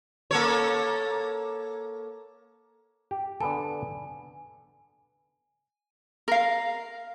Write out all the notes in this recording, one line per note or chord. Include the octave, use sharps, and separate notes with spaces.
A#3 A4 C#5
G4
D3 B3 A4 G#5
A#4 F5